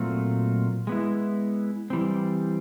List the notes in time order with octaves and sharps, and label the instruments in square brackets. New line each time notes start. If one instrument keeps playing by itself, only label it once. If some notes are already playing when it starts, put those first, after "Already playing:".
Already playing: [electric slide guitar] A#2 F#3 A3 C4 F4
G#3 B3 E4
E3 G3 C4